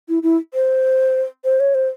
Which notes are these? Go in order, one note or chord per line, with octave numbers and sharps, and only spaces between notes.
E4
E4
C5
C5
C#5
C5